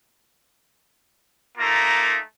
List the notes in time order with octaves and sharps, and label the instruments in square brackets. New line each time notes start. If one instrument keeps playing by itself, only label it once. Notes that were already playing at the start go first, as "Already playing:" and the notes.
[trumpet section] A3 A#3 D#4 F4 A#5